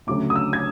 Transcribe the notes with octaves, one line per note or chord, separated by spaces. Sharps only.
D2 C#3 F#3 A3 D6
D#6
E6
G#6